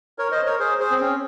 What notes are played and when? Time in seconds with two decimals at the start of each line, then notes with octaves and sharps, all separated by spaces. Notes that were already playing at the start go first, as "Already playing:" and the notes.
0.18 A#4 C#5
0.31 C5 D#5
0.46 A#4 C#5
0.59 G#4 C5
0.80 G#4 C5
0.91 C4
1.01 C#4